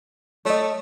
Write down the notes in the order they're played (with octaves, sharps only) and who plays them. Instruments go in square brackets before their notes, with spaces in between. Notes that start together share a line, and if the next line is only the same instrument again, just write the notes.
[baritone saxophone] A3 [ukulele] C#5 D#5